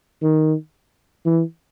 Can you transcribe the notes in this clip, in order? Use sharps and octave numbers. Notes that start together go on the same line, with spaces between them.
D#3
E3